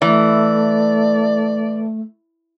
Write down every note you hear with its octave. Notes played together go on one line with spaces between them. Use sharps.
E3 A3 D5